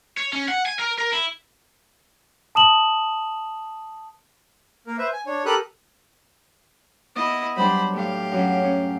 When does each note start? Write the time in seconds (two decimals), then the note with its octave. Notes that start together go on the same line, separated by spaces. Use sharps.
0.17 C#5
0.33 C#4
0.48 F#5
0.66 G#5
0.79 A#4
0.98 A#4
1.13 E4
2.55 A5 D#6 E7 F#7
4.87 A#3 A#4
4.98 B4 C5 E5
5.13 G#5
5.27 D4 C#5
5.46 G4 A4 A#4 B5 D#6 F#6
7.16 B3 E4 D#5
7.56 F#3 G3 D4 C5 B5
7.93 A2 G4 F5
8.31 F#2 F#3 C#4
8.64 C#4